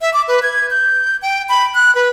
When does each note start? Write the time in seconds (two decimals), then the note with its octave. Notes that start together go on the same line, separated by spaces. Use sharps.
0.01 E5
0.14 D6
0.28 B4
0.43 G#6
0.71 G6
1.22 G5
1.49 B5
1.75 F#6
1.95 B4